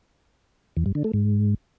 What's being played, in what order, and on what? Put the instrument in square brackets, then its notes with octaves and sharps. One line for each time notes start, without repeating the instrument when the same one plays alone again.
[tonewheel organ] E2
G2
D3
A3
G#2